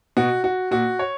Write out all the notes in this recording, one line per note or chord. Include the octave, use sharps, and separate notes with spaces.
B2 F#4
F#4
A#2 F#4
C#5